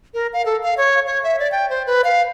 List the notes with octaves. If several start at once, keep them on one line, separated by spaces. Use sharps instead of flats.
A#4
F5
A4
F5
C#5
C#5
E5
D5
G5
C5
B4
F5